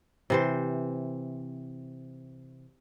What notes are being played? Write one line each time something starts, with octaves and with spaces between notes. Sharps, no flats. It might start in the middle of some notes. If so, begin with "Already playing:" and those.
C3 E3 C5